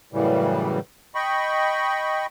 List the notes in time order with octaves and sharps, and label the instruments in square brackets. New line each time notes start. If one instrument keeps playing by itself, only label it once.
[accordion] F#2 A2 C#3 E3 G3
D#5 G5 B5 C#6